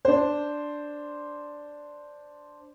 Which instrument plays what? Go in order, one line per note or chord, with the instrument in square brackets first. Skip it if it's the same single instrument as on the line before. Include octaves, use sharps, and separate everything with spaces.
[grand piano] D4 C5